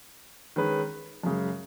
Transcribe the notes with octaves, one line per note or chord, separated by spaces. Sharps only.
D#3 G#3 C#4 G#4 B4
F#2 C#3 G#3